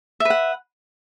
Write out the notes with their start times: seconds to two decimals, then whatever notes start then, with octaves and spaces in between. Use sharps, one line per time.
0.20 E5
0.25 B4
0.30 F#5